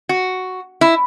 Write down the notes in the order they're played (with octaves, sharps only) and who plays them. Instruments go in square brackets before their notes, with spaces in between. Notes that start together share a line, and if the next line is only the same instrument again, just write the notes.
[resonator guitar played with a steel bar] F#4
E4